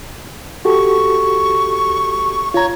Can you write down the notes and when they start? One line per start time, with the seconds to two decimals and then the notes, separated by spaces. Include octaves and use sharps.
0.65 F#4 G4 A4 C#6
2.54 F4 C#5 A#5